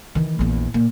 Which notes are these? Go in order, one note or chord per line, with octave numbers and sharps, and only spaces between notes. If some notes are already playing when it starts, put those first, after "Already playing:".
D#3 E3
A#1 E2
A#2